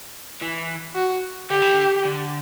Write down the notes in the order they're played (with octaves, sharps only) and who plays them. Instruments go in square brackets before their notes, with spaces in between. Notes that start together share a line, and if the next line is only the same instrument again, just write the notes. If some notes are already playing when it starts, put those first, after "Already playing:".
[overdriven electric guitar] E3
[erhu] F#4
[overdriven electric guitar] D3 [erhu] G4
[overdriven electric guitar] E3
D3
D3